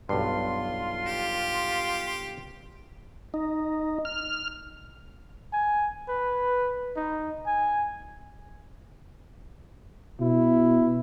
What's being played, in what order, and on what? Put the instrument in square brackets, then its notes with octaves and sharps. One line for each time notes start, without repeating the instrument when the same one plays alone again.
[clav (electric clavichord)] B1 G2 [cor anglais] F4 [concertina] C6
[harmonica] G4
[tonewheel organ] D#4
F6
[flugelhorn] G#5
B4
D#4
G#5
[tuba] B2 [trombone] E4